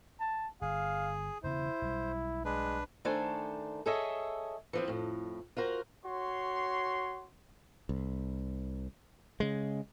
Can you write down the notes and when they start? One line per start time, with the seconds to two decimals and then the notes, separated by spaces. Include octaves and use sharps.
0.20 A5
0.62 G1 G#4 F5
1.44 E1 C#3 B3 E4 C5
1.82 B1 G3
2.45 G#3 D4 B4
3.05 D#3 A3 D4 A4 C5 G#5
3.86 G#4 A4 C#5 D#5 E5
4.73 E3 F3 C4
4.88 F2 A2
5.57 F4 F#4 A#4 C5
6.05 F#4 C#5 C6
7.89 C2
9.40 C#3 G#3